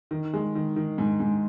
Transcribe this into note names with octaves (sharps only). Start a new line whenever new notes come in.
D#3
G#3
D#3
D#3
G#2
G#2